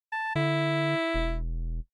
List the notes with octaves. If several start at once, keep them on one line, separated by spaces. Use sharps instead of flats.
A5
D3 E4
E1